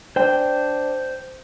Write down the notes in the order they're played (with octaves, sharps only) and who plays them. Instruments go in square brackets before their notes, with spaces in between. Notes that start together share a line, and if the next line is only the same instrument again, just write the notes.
[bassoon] D4 [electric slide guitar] C5 G5